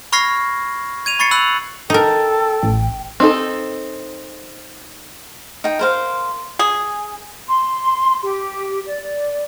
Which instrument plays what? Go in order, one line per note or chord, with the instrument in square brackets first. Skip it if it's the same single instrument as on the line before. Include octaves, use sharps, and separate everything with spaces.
[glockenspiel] B5 C#6 F6 G#6 A#6 C7
G#6 D#7 F7
B5 C#6 A6 C7 C#7
B5 E6 F#6 F7 F#7
[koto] D#4 A#4 [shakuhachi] A4 [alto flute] G5
[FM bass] A1
[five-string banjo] C4 D#4 A4
[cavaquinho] D#4 G5
A#4 C5 F5
[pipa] G#4
[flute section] C6
G4
D5